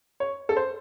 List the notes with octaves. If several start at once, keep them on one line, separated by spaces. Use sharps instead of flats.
C#5
A4
C5